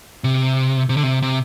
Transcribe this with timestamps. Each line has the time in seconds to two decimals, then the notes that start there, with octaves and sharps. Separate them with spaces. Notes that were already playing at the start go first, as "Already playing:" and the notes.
0.24 C3
0.89 C3
0.97 D3
1.03 C3
1.22 C3